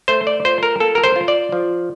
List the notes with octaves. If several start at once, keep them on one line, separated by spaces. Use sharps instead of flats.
A3 C5
D5
F4 C5
A#4
A#3 A4
A#4
C5
F4
D5
F3